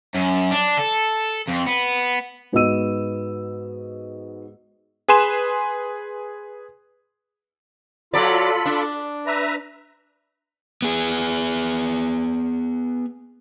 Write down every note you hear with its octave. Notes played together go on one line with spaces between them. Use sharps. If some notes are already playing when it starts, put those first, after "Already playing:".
F#2
D4
A4
F2
B3
G#2 B3 F#4 D#5 E6 D#7
G#4 B4 G#5 C6 E7
F#3 F4 A4 D5 B5
D4
B4 E5 A#5
B3 G#4